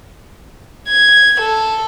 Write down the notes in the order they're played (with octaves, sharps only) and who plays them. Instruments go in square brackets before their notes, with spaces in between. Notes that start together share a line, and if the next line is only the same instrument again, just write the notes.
[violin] G#6
A4